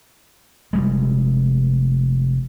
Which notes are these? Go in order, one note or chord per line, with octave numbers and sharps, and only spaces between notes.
F1 G3 G#3